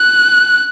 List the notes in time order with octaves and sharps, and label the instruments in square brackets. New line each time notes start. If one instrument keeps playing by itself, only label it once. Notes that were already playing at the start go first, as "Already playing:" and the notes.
Already playing: [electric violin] F#6